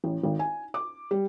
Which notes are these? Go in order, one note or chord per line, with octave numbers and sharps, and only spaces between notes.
A1
G#1
G#5
D6
G3